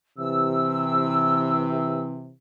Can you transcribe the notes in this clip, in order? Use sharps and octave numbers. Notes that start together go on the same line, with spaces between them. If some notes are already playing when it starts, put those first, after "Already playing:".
C3 E3 E6